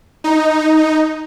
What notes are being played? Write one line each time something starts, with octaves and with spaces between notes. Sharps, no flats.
D#4